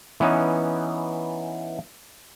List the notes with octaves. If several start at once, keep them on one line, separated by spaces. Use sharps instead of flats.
E3 B3 C#4 D#4